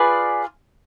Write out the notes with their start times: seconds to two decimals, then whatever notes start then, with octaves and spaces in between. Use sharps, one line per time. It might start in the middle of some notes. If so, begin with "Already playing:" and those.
Already playing: F4 G#4 B4 D5